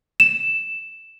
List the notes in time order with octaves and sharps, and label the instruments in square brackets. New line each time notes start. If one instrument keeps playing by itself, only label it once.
[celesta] E7